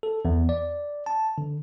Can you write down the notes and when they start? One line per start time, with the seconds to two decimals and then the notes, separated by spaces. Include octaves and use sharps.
0.03 A4
0.25 E2
0.49 D5
1.06 A5
1.38 D3